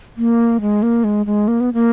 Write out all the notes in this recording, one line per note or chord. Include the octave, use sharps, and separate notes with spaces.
A#3
G#3
A#3
G#3
G#3
A#3
B3
A#3